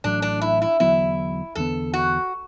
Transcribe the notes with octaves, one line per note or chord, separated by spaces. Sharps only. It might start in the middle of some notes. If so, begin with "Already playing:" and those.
A1 A2 F#3 D4
D4
E4
E4
E2 D3 F#3 B3 E4
E2 D3 B3 A4
F#4